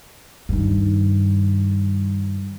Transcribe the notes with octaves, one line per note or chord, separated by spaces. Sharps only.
G2 D#3